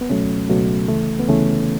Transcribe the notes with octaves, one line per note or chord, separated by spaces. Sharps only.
B3
C#2 B2 F#3 A3 C#4
C#2 B2 F#3 A3
D2 C#3 E3 A3
B3
D2 C#3 E3 A3 C#4